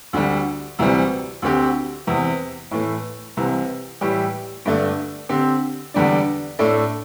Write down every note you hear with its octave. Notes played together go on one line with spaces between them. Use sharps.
D2 D3 G3
D2 C3 E3 G3
D2 D3 C4 G4
E2 C3 E3
A2 E3 A3
C2 C3 E3
A2 E3 G3 E4 G4
G2 D3 A3 D4
D3 C4 G4
E2 D3 G3 D4
A2 A3 D4 A4